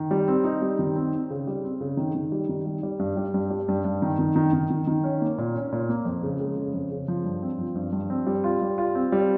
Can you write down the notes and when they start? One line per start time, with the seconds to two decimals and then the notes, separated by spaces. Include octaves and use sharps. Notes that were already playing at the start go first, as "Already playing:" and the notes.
Already playing: D#3
0.11 G3
0.28 C4
0.44 D#4
0.62 G3
0.79 D#3
0.96 C4
1.13 C4
1.30 C#3
1.47 G3
1.64 C4
1.81 C#3
1.97 D#3
2.15 D#3
2.32 G3
2.49 D#3
2.66 G3
2.83 G3
2.99 G2
3.17 G3
3.34 G2
3.50 G3
3.68 G2
3.85 G2
4.02 D#3
4.19 D#3
4.36 D#3
4.53 D#3
4.70 D#3
4.87 D#3
5.04 C#4
5.21 A#3
5.38 A#2
5.54 C#4
5.72 A#2
5.89 A#3
6.05 F2
6.23 C#3
6.40 G#3
6.57 C#3
6.73 F2
6.91 C#3
7.08 F3
7.24 G2
7.42 C4
7.59 F3
7.75 G2
7.92 G2
8.10 C4
8.27 G3
8.44 F4
8.61 G3
8.78 F4
8.95 C4
9.12 G3